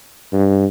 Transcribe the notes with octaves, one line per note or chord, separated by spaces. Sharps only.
G2